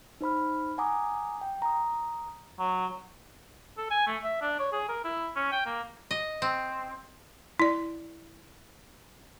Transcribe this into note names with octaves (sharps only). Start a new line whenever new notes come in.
D#4 C5 B5 F6
F#5 G#5 A#5 D6 D#6
G5
A#5 D#6
F#3
A4
G#5
A3
E5
D4
C#5
G#4
A#4
E4
C#4
G5
A#3
D#5
C4
E4 D5